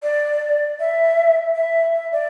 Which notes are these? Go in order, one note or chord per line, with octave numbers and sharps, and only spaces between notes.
D5
E5
E5
E5
D5